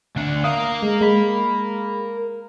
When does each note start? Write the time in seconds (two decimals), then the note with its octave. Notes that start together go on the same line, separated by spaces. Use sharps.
0.16 D2 D4
0.44 A#4 F5 D#6
0.83 G#3
1.01 G#3 B5